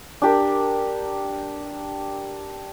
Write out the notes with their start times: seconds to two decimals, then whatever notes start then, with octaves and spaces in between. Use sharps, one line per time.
0.22 D4 G4 A#4